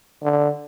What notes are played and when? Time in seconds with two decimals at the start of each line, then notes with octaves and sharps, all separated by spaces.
0.23 D3